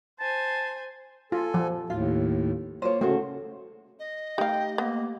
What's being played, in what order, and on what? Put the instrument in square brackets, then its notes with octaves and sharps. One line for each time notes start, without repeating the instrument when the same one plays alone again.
[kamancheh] C5 G#5 [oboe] A5
[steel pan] F4 [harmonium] A4 G#5
[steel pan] F3
[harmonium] D#2 A2 [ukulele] F4
[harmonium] A#3 F4 [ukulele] C5 C#5
[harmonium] C#3 C#4 [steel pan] A3 [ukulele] F#4 C5
[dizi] D#5
[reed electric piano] A3 G4 [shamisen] D#4 F5 [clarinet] G5
[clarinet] A#3 [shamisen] B3